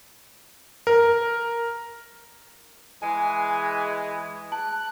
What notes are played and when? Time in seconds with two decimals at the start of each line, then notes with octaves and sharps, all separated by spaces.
0.87 A#4
3.02 E3 G#3 G#5
4.52 A5 F#6